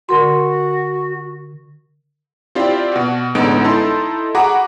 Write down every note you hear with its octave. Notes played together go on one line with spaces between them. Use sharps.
D3 F#4 A#4 C6
C4 E4 F4 G4 C5 D5
B2 F#4
A1 D3 G#3 B3 D#4 D7
D#4 E4 A4 A5 C6
F#4 G#4 F#5 A#5 B5 D6